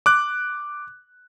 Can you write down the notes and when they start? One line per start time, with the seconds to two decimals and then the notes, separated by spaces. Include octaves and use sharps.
0.06 D6 F#6